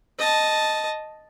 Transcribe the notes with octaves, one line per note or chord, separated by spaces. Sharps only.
D#5 A5